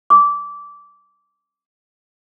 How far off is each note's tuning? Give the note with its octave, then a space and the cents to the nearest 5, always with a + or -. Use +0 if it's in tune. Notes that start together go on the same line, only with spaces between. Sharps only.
D6 -20